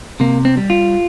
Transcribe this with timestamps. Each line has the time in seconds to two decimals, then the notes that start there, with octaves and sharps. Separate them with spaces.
0.20 C3 A#3
0.45 C4
0.57 G3
0.70 F4